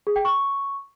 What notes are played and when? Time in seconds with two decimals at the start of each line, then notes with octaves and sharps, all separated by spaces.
0.07 G#4
0.16 G5
0.25 C#6